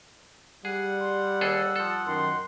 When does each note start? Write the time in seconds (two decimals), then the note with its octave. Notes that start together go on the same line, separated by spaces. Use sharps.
0.65 G3 G#4 F#5
1.00 C6
1.41 D#2 G#4 A4 E6
1.76 F3 A4
2.06 F#2 D#3 C6